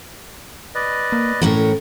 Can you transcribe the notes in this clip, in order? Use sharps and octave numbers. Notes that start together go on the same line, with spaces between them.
B4 D5 D#5
A#3
A2 E3 C#4 A#4